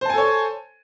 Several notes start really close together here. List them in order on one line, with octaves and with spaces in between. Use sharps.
C5 A5 G#5 A4 C#5